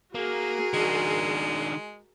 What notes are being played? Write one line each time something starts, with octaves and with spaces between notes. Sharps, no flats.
A#3 F#4 G#4 A#4
D#3 G#3 D4